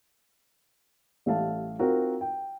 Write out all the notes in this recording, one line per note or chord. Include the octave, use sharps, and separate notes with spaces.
A1 G3 A3 G4 F5 A5
C4 D#4 F4 F#4 A#4
G5